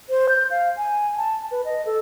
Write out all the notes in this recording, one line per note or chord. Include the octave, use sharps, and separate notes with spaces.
C5
G6
F5
G#5
A5
B4
D#5
A4